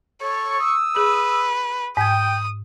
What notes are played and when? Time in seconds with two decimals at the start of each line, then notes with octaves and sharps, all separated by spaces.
0.21 A4 C#5 C#6
0.60 D#6 E6
0.96 G#4 B4
1.97 G#2 G5 D#6 G#6